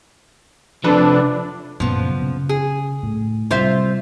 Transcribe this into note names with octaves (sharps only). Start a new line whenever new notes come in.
C3 F3 D4 A4 B4
F#2 A#2 C#3 F3 B3
C#3
G#4
A2
C3 G3 F4 C5 E5